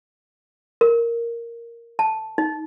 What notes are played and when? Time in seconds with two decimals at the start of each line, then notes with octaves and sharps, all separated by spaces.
0.81 A#4
1.99 A5
2.38 D#4